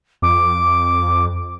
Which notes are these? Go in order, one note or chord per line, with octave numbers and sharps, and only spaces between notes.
F2 D6